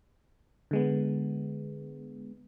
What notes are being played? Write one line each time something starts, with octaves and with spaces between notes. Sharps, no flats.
D3 G#3 B3